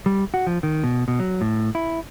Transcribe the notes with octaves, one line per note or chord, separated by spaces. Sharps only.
G3
F#4
F3
D#3
B2
B2
F#3
A2
E4